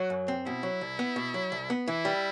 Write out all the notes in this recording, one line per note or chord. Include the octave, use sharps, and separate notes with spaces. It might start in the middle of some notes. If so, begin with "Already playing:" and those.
Already playing: F#3 F#4
F#2
C4
B2 E4
F#3
C2
B3
B2
F#3
C2
B3
E3 E4
G3